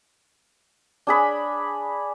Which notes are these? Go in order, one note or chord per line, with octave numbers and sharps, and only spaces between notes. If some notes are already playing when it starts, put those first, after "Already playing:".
D4 G#4 B5